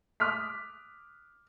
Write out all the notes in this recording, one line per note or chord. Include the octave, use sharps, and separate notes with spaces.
D6 D#6 F6 F#6 B6